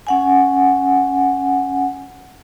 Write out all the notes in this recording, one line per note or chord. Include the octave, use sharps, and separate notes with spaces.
C#4 F#5 G#5